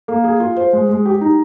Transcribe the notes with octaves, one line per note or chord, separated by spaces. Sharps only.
A#3
G#4
F4
C5
G#3
G#3
G4
D#4